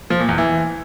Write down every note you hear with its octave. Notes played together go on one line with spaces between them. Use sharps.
F3
A#2
E2
E3